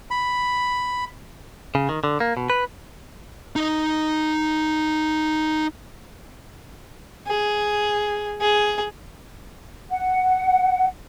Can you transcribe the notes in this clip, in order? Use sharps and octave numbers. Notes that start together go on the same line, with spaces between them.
B5
C#3
D#3
D3
A#3
B2
B4
D#4 D#5
G#4
G#4
F#5